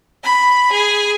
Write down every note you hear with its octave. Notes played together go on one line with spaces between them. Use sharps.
B5
G#4